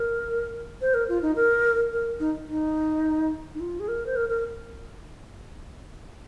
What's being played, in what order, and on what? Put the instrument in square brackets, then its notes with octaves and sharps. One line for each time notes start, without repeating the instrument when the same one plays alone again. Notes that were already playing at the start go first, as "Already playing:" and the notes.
Already playing: [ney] A#4
C5
A#4
F4
D#4
A#4
A#4
D#4
D#4
D#4
F4
G#4
A#4
C5
A#4
A#4